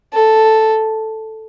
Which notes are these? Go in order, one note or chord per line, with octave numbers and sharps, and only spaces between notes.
A4